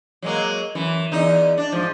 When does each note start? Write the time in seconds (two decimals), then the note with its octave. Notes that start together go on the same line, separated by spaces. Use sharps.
0.22 F#3 G#3 A#3
0.75 F#2 E3
1.12 E2 D#4
1.58 D4
1.72 G#2 F3